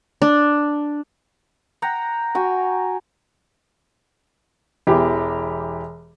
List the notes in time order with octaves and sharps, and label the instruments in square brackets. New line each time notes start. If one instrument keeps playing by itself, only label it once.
[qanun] D4
[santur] F#5 G5 A#5
[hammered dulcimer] F#4 G#5 [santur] G5
[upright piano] E1 E3 G4